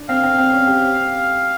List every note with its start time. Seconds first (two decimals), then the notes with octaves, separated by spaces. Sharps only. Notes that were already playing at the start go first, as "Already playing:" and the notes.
Already playing: D4
0.09 C4 F5
0.24 C4
0.38 C4
0.53 C#4
0.67 G4